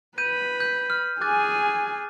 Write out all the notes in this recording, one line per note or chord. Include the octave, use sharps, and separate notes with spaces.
B4 B5 G6 D#7
G6
F6
G#4 G#5 D6 F#6 A6